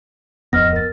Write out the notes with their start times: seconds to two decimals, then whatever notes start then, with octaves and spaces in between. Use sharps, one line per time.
0.53 D1 F2 B3 D#5 F6 A#6
0.73 A#4 A6